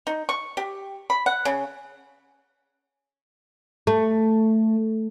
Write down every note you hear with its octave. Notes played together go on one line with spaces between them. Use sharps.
D#4
C#6
G4
B5
F#5
C#3
A3